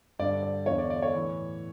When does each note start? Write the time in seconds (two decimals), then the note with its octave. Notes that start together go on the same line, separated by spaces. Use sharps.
0.19 G2 D3 D5
0.42 D5
0.66 E2 D3 C#5
0.78 D5
0.90 D5
1.02 C#5
1.14 A2 E3